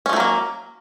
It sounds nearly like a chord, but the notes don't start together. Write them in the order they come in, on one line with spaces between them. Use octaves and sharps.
C#4 F3 A3 F#3 A#3